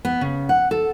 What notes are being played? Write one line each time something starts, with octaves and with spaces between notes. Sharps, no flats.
B3
C#3
F#5
A4